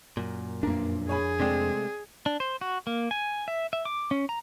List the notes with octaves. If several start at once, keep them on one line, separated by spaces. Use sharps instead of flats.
F#2 A#2
F2 A#3 D4 A#4
G#4 C#5 G#5 B5
C3 G#3 A3 C4 D5 G5
D4
C5
F#4
A#3
G#5
E5
E5
D6
C#4
A#5